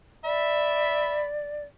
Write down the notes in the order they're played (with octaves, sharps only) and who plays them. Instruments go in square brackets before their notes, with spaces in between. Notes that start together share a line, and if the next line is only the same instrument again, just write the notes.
[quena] D5 [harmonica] E5 B5